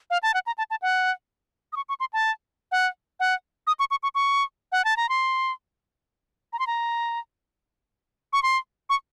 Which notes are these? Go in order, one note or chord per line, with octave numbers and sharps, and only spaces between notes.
F5
A5
F#5
A#5
A5
A5
F#5
D#6
C#6
C#6
C6
A5
F#5
F#5
D#6
C#6
C#6
C#6
C#6
F#5
A5
A#5
C6
A#5
C6
A#5
C#6
C6
C#6